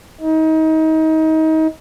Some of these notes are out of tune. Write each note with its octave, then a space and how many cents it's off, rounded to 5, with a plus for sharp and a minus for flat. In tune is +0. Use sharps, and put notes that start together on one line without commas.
D#4 +30